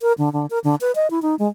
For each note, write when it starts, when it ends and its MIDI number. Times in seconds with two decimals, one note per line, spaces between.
0.01 0.13 70
0.18 0.32 50
0.33 0.46 50
0.50 0.59 70
0.64 0.75 50
0.81 0.92 71
0.95 1.10 75
1.11 1.22 64
1.22 1.35 63
1.39 1.48 56